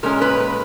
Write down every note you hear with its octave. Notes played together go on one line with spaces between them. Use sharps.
A#2 G#3 C#4 A#4
B4
B4